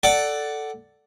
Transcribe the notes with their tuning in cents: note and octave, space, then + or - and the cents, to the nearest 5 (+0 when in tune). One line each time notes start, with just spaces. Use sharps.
A4 +0 D5 +0 F#5 +15